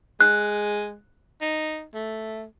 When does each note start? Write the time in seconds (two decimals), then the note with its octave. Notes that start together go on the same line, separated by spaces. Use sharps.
0.21 G#3 F#6
1.41 D#4
1.94 A3